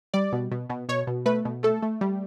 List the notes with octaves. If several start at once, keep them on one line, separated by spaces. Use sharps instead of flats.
G3 D5
B2
B2
B2
B2 C#5
B2
A3 B4
B2
A3 A4
A3
G3